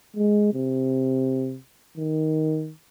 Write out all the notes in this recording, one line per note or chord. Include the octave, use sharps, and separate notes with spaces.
G#3
C3
D#3